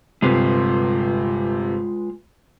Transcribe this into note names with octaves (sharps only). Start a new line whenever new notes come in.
G1 C3 G#3 F4 B4